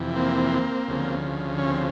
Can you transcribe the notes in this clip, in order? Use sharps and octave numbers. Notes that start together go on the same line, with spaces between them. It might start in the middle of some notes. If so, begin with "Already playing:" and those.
Already playing: F2 C3 E3
A#3 C4
D2 C#3 F3
C#4
C4